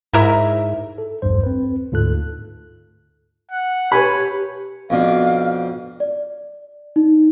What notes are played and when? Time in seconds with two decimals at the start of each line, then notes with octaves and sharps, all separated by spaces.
0.13 G#2 E4 A#4 E5
0.98 A4
1.22 A#1 E2 G2 C5
1.43 C4 B4
1.92 D2 G#2 F4 A4 F#6
3.51 F#5
3.92 G4 B4 C#5 G#5 B5
4.90 F2 B2 D4 F5
6.00 D5
6.96 D#4